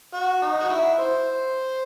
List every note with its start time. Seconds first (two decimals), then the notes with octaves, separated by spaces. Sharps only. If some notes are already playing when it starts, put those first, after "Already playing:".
0.14 F#4
0.42 D#4
0.60 F#4
0.70 E4
0.98 C5